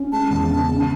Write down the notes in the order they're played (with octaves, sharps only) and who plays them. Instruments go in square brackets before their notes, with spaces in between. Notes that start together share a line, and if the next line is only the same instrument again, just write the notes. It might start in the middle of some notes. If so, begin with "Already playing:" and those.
Already playing: [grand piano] C#4
[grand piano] G#3 [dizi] A5
[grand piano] E2
C#3
C#3